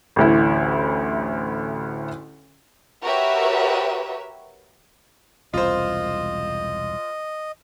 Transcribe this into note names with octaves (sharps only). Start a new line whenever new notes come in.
A1 D2 E4
F#4 G4 A#4 B4 C#5 E5
E1 C2 F4 C5 D#5